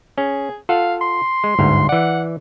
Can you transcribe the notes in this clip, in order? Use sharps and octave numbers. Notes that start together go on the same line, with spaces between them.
C#4 G#4
F4 A4 F5 F#5
C6
G#3
G1 D2 G#2
E3 D5 F#5